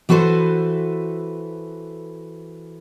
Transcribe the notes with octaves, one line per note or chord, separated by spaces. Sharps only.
E3 F#4 A4 B4 C5